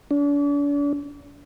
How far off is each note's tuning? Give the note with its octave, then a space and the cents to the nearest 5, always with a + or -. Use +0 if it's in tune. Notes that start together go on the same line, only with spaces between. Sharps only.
D4 -40